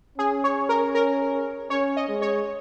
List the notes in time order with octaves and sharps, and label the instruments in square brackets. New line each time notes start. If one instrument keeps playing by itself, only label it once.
[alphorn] C#4 [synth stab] G#4
[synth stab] C#5
A#4
A#4
[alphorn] C#4 [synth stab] C#5
[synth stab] D#5
[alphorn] G#3
[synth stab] C#5